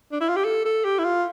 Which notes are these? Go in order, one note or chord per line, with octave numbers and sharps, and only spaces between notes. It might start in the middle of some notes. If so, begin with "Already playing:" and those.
D4
E4
F4
G4
A4
A4
G4
E4
F4